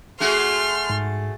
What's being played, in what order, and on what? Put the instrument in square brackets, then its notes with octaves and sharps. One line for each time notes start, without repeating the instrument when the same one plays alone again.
[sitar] A3 F#4 G#4 [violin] C6 F6
[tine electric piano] G#2